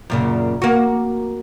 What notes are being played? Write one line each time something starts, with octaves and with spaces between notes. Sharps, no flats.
F#2 A#2 C#3
A#3 F#4